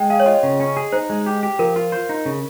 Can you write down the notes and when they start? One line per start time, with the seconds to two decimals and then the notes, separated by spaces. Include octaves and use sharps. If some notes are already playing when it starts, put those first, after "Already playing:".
Already playing: G#3 G5
0.10 G#4 F5
0.20 C#5
0.26 F4 D#5
0.43 C#3
0.60 C#4
0.77 G#4
0.92 D#4 C5
1.10 G#3
1.26 G4
1.43 G4
1.59 F3 A#4
1.76 F4
1.92 C5
2.09 D#4
2.26 C#3